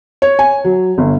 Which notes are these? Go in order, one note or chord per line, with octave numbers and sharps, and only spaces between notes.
C#5
G#5
F#3
G1